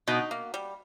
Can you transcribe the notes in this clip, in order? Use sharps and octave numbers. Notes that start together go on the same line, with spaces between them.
B2 D#4
A#3
G3